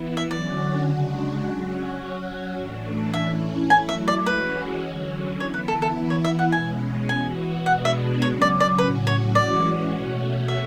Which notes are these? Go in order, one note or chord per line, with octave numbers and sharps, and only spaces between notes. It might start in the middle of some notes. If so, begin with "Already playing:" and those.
Already playing: E3 B3 E4
E5
D3 F#3 C#4 F#4 D5
C#3 G#3 D4 F#4
F#3 C#4 F#4
F#3 C#4 F#4
A2 E3 A3 D4
E3 A3 C#4 E4 E5
F#3 A3 E4 G#5
E5
D5
E3 G#3 C#4 F#4 B4
D3 F#3 C#4
E3 B3 E4 C#5
B4
A4
A4
E3 B3 E4
C#5
E5
F#5
B2 G#3 C#4 G#5
E3 B3 F#4 G#5
B2 G#3 B3 D4 F#4 F#5
E5
C#3 F#3 C#4 C#5
D5
D5
A2 F#3 C#4 F#4 B4
C#5
E3 G#3 C#4 F#4 D5
B2 A3 C#4 F#4
E5